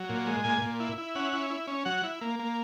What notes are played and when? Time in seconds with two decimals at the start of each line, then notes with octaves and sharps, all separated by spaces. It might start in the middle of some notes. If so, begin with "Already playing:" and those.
Already playing: F#3
0.09 A#2
0.27 G#3
0.44 A#2 G#5
0.61 A#2
0.80 E4
0.98 E4
1.15 C#4 F#5
1.33 E4
1.50 E4
1.67 C#4
1.85 F#3 F#5
2.03 E4
2.21 A#3
2.39 A#3